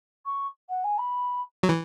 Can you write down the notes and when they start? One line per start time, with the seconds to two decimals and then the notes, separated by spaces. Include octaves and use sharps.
0.25 C#6
0.69 F#5
0.84 G#5
0.98 B5
1.63 F#3
1.69 E3